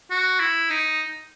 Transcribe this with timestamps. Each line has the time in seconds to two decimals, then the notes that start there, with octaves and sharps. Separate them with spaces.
0.11 F#4
0.40 E4
0.70 D#4